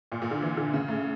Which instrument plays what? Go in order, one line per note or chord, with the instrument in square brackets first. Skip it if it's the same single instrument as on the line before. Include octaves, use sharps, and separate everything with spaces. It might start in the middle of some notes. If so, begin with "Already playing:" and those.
[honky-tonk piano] A#2
A#2
D3
E3
D3
C#3
A2